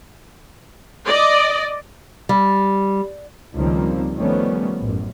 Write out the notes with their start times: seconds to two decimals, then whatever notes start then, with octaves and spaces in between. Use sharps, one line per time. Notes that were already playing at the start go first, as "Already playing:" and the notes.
1.06 D5 D#5
2.29 G3
3.55 C#2 D#3 F3 G3 A#3 C4
4.15 D#3 F3 G3 A3 B3 C#4
4.81 A1 F#2